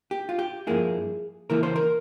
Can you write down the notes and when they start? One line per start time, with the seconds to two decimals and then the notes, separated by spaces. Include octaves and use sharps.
0.11 G4
0.29 F4
0.39 G4
0.67 G2 F3 A#3 E4 G#4
1.50 C#3 E3 A#3 E4 A#4
1.63 C5
1.76 A#4